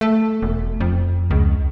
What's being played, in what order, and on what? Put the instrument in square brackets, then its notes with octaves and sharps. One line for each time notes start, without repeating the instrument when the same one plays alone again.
[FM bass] A3
E1
F2
C#2